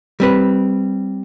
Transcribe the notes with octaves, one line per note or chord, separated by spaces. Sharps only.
G3 C4 B4